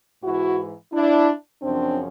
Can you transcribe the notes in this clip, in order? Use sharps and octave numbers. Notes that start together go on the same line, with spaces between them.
G#2 E3 E4 F#4
D4 E4
F#2 C#3 F3 C4 D4